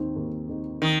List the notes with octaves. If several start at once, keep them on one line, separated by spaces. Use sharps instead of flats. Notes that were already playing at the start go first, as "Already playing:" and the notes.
Already playing: D#2 D#3 C4 D#4
D#2
D#3 C4 D#4
D#3